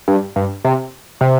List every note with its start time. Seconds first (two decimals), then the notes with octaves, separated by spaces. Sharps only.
0.08 G2
0.36 G2
0.65 C3
1.21 C3